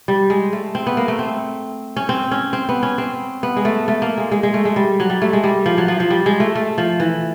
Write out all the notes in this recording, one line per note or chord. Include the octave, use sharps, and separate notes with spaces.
G3
G#3
A3
C4
B3
A#3
A3
C4
C#4
C4
C#4
C4
B3
C#4
C4
B3
G#3
A3
A3
A#3
G#3
G#3
G#3
A3
G#3
G3
F#3
G3
A3
G#3
G3
F3
F#3
F3
F3
G3
G#3
A3
A3
F3
E3